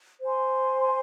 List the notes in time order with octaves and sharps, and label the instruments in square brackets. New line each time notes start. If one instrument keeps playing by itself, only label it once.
[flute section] C5 G#5 C6